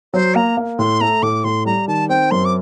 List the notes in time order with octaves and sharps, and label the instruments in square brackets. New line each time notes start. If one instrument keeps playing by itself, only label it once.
[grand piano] F#3 [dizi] C5
[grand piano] A#3 [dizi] A#5
[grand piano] A#3
[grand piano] A2 [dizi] C6
[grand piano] A3 [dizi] A#5
[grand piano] A2 [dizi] D6
[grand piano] A2 [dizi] C6
[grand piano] G3 [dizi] A#5
[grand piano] D#3 [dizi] A5
[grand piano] C4 [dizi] G5
[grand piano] F#2 [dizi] C6
[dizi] D6